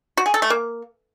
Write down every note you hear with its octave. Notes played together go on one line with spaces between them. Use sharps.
F#4
G#4
A4
A3
A#3